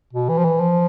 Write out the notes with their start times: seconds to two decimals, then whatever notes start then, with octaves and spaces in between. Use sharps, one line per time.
0.13 B2
0.29 E3
0.38 F3
0.45 E3
0.60 F3